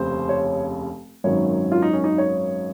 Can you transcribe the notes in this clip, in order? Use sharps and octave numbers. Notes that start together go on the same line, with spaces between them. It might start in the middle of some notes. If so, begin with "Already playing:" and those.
Already playing: F1 D#2 C#3 C5
C#5
G#1 F#2 D#3 F#3 C#5
F4
D#4
C#4
D#4
C#5